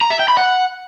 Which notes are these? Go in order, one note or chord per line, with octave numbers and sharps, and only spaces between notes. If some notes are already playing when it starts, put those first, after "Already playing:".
A#5
E5
G5
B5
F#5